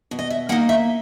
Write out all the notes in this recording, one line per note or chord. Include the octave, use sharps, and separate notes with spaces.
B2
D#5
E5
A#3 D#4 F#5
E5